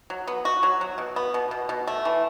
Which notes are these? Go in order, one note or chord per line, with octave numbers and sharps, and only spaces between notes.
F#3
B3
F#4
F#3
F#3
B2
B3
B2
B2
B2
A3
E3